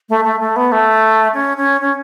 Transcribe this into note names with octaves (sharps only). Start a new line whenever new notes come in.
A3
A3
A3
B3
A3
C#4
C#4
C#4